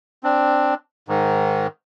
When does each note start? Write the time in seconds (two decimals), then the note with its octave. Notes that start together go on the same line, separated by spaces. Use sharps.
0.23 C4 D4
1.08 G#2 D#3